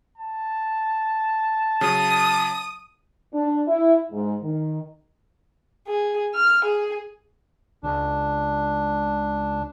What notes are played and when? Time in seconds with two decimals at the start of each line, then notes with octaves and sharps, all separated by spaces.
0.18 A5
1.81 C#3 F#3 D#6
3.33 D4
3.67 E4
4.12 G#2
4.42 D#3
5.87 G#4
6.35 F6
6.65 G#4
7.83 C#2 D4